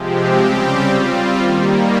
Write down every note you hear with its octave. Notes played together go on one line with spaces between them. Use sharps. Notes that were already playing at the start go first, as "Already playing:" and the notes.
Already playing: C3 F3 G#3 C4 G4
C#3 G3 C4 G4
G3 C4 F4
D#3 G3 A#3